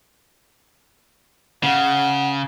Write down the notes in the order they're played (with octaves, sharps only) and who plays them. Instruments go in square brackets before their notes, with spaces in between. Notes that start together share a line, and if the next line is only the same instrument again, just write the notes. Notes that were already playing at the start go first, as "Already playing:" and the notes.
[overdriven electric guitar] C#3 [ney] F#5